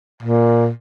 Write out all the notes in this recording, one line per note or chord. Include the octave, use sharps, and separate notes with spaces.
A#2